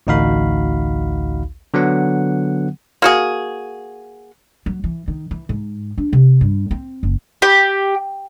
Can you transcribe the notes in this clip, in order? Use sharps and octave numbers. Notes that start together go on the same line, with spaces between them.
A1 D2 D#4 F#4 F5 B5
D3 F#3 B3 F#5
A#3 F#4 G#4
F#3
E3
D#3
E3
G#2
D4
C3
G2
C4
F#1
G4